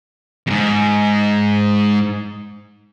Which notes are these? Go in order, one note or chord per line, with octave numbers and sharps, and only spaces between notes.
F2 G#2